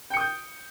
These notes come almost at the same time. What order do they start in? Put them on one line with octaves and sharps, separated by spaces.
G5 C#7 D#6 G6